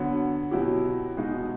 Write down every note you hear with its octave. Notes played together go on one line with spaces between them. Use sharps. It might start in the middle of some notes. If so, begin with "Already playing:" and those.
Already playing: D3 F#3 B3
B2 F#3 B3 E4 G4
B2 G#3 B3 D#4 F#4